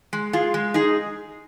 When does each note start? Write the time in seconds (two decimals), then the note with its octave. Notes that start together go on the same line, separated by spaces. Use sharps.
0.13 G#3
0.33 F4 G#4
0.54 G#3
0.74 D#4 G#4